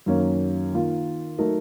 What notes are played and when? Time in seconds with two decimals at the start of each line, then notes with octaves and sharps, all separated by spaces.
0.06 F#2 D#3 A#3 C#4
0.73 D#3 A#3 F4
1.39 F#3 A3 D#4 A#4